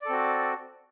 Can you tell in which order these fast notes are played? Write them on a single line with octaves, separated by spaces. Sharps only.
D5 A4 C4 F#4